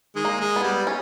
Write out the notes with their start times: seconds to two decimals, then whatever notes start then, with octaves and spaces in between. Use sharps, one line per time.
0.16 D#3 G#3
0.25 A#3
0.40 G#3
0.56 B3
0.63 G3
0.87 C#4